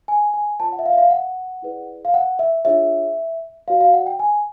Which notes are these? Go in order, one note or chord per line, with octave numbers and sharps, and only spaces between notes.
G#5
G#5
F4 A#4 C#5 A5
F#5
E5
F5
E5
F5
F#5
E4 G#4 B4 D5
F5
F#5
E5
D4 F4 G#4 C#5 E5
F#4 B4 D5 F5
F5
F#5
G5
G#5